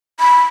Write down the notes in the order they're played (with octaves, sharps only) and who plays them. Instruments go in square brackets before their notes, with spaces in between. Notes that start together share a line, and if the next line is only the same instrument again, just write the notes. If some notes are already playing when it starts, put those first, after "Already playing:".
[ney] B5